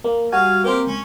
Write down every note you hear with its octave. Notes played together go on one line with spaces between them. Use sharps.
A#3
G3 F#4 F5 G#5
A#3 C4 G4 A#4 C5
C#2 C#4